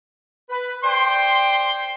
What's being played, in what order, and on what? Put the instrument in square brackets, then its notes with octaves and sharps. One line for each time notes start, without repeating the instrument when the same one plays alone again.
[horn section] B4
[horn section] C5 D5 G5 [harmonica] C6